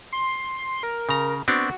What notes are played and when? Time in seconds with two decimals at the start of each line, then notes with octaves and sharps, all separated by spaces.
0.12 C6
0.83 A#4
1.09 C#3 A#5
1.48 B3 C4 D4 F#4